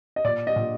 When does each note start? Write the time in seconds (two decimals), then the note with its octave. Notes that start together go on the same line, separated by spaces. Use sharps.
0.16 D#5
0.24 A#2 D5
0.47 D#5
0.56 A#2